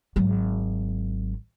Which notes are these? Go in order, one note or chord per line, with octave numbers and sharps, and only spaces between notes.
G#1 F#3